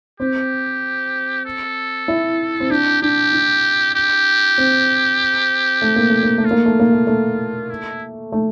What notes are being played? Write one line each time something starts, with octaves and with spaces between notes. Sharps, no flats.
C4 G4
A4
E4
C4
D4 G4
D4 G4
D4
G4
C4
A3
A#3
A3
A#3
A3
F4
A#3
A3
A#3
A3
A3
E4
A3